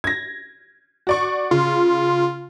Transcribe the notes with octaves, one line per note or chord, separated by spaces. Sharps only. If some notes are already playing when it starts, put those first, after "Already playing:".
G#6 A#6
F#4 D5 C#6
C#3 F4